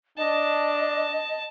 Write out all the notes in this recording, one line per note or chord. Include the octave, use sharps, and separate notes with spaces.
D4 D#5 A5